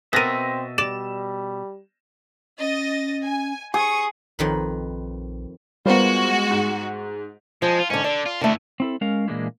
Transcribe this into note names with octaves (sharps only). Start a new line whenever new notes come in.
B2 B3 C4 A#4 E5 A6 A#6 D#7
G3 D5 E7
C#4 D#5 A6
G#5
G#4 C#6 D#6
A#1 F2 D#3 B4
G3 G#3 B3 F4 F#4 A#4 C5
G#2
F3 G#3
F4
G#2 D3 C#4
D3 D5
F4
G2 D3 E3 A3
C4 E4 A4
G#3 C#4 A#4 F5
A#2 E3 G#3 A#3 D4 E4